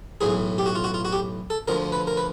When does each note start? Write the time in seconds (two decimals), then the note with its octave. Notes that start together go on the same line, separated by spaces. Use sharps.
0.21 B1 A2 E3 G#4
0.58 G4
0.66 F#4
0.75 F4
0.84 F#4
0.94 F4
1.05 F#4
1.12 G4
1.50 A4
1.68 D2 D3 F3 A#4
1.92 B4
2.07 A#4
2.17 B4